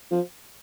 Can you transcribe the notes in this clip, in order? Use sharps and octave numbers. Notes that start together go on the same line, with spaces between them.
F3